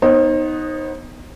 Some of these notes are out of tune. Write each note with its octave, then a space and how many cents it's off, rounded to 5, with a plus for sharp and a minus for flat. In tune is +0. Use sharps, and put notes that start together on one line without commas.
B3 +0 D#4 +0 C5 +40